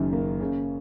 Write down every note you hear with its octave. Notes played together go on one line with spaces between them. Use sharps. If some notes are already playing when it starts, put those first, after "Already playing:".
Already playing: F#1 F#2 D#3
A#3
C#3